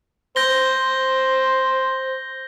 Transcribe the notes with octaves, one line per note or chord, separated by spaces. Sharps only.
C5 G6 A#6 G7